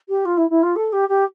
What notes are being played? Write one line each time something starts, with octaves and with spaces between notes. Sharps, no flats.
G4
F4
E4
E4
F4
A4
G4
G4